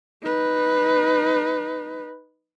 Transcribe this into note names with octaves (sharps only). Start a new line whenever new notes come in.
D#4 B4